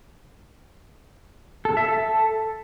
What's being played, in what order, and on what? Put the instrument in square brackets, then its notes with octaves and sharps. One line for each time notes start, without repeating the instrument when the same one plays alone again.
[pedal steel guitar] A4
E5
A4